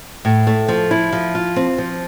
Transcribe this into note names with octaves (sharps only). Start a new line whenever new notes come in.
A2
A3
F3
E4
F3
F4
C4
F3